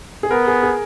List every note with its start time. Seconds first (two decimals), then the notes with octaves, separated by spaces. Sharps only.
0.23 G#4
0.31 B3 A#4
0.47 G#4
0.63 G#4